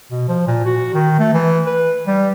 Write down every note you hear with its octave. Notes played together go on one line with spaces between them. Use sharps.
B2
F3
A#2
F#4
D#3
A3
E3
B4
G3